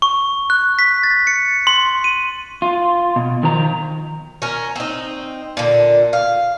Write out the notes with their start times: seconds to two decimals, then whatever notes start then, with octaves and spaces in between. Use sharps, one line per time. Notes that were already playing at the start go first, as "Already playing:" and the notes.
0.02 C#6
0.50 F#6
0.79 B6
1.03 A6
1.27 C#7
1.67 C6
2.04 D#7
2.62 F4
3.16 B2
3.43 D#3 F3 A#5
4.42 C#4 A#4
4.76 C4 D#4
5.57 A#2 D3
6.13 F5